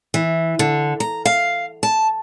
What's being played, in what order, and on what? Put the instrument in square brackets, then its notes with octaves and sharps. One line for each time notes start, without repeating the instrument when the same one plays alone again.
[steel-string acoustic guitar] E3
D3
A#5
F5
A5